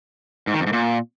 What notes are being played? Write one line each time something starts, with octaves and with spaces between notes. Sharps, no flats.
G#2
D#3
F2
G#2
A#2